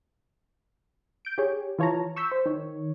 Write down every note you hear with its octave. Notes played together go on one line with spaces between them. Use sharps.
G6 D7
G4 G#4 C#5
E3 F4 C#5 A5 A#5
C#6 E6 G6 B6
C5
D#3 C#5